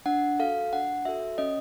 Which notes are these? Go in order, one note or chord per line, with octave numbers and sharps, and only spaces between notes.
D4 F#5
F#4 A4 F5
D4 F#5
F#4 A4 E5
C#4 D#5